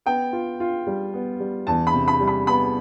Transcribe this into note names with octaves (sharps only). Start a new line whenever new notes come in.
B3 G5
F4
F4
G3
B3
G3
E2 A5
B5
C3
B5
G3
B5
B3 B5